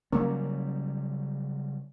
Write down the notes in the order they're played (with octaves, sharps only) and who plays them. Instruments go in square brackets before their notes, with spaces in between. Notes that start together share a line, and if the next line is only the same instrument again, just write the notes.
[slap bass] C#3 F#3 G3 [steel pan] A#3 [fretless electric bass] C#4